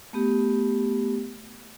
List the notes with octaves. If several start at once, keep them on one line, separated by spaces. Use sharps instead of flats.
A3 B3 G4